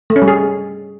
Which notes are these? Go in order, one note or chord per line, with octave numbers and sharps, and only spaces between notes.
A3
C#4
G3
G#4